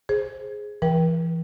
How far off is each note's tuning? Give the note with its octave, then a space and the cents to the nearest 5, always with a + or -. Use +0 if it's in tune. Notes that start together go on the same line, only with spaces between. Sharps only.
G#4 +0 C5 +10
E3 +25 A#4 +45 G5 +0